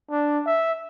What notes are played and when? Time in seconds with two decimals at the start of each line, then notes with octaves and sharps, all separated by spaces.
0.11 D4
0.46 E5